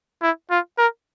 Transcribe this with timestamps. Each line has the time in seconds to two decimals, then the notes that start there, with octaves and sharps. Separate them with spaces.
0.22 E4
0.51 F4
0.78 A#4